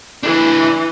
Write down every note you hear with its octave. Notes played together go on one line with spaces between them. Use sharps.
E3 D4 E4